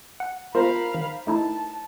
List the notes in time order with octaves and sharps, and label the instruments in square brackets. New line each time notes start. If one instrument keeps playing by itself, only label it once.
[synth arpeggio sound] F#5
[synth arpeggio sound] F4 [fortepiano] A#4 C5 [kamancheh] F5 B5
[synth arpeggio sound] D#3
[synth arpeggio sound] A3 D#4 E4 [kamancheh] A5